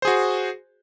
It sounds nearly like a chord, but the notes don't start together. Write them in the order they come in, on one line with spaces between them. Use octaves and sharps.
C5 G#4 F#4